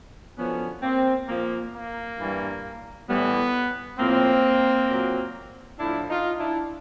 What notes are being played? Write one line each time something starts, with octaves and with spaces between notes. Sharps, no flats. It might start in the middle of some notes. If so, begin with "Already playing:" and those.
F#2 D3 F3 B3 C#4
A#3 C4
A#2 F3 A#3
A#3
G2 E3 G3
A2 E3 G3 B3
A2 F3 A#3 C4
A#2 F#3
A2 F3 D4 E4
D#4 F4
D4 E4